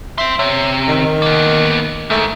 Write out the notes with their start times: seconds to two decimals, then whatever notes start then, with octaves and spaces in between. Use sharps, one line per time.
0.18 E5 G5 C6
0.39 C3 C#5
0.89 D#3
1.22 A#3 B3
2.10 G#2 A3